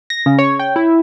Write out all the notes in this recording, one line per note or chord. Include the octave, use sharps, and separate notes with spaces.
A#6
C#3
C#5
G5
E4